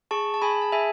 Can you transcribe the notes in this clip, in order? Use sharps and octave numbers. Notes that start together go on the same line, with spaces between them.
G#4 A5 C#6
A5
G#4 G#5 B5
A5
G#4 E5 G#5